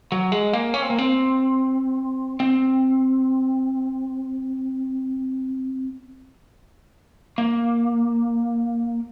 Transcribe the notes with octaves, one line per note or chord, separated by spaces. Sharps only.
F#3
G#3
A#3
C#4
C4
A#3
C4
C4
A#3